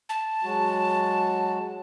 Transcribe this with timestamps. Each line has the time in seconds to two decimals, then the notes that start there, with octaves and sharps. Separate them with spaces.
0.09 A5
0.44 F#3 G#3 F#4